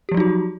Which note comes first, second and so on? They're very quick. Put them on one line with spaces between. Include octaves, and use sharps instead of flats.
G4 F3 F#3 D#4 F#4